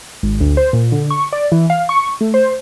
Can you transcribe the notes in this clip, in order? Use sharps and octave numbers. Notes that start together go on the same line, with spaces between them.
G#1
D2
C5
A#2
D3
C#6
D5
E3
F5
C#6
A3
C5